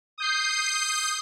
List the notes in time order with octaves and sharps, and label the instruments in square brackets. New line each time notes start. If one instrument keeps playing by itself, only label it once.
[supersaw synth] D#6 G6 C7